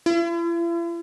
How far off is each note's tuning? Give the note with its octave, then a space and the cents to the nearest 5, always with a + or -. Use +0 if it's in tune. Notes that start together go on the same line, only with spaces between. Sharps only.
E4 +45